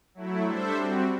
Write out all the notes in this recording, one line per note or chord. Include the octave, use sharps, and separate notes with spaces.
F#3 A3 E4
G3 D4 A4 C5 E5
G3 C4 F#4